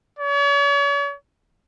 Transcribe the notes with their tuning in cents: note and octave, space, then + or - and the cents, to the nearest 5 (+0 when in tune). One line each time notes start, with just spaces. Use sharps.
C#5 +40